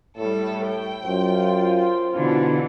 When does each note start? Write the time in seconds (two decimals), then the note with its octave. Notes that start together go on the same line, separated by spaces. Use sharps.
0.16 A2 G3 A4
0.65 G5
1.04 F#2 F4 C5
2.15 B2 D3 E3